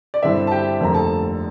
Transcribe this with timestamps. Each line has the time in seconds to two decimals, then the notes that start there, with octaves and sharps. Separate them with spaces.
0.14 D5
0.23 G2 D3 G3 C4 E4 E5
0.47 A5
0.51 G4 G5
0.80 F1 F2 D3 F3 A#3 A#5
0.94 A4 A5